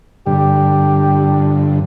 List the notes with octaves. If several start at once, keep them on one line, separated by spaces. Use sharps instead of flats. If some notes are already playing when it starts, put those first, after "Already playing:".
G2 D3 G4